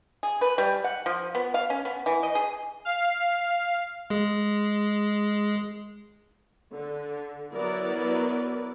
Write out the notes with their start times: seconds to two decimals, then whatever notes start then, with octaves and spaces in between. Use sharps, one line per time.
0.23 G#4
0.41 B4
0.58 G3
0.84 F#5
1.06 F3
1.35 B3
1.54 F5
1.70 C#4
1.85 B3
2.06 E3
2.23 D#5
2.35 G#4
2.85 F5
4.10 G#3 G#4
6.73 D3
7.53 F#3 B3 E4 A#4 B4 D5